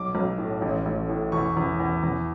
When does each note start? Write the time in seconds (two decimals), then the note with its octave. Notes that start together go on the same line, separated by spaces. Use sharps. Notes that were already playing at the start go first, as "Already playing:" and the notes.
Already playing: B1 D6
0.15 B1
0.38 A2
0.62 A1
0.85 A1
1.09 A2
1.32 E2 C#6
1.57 E2
1.80 E2
2.03 E2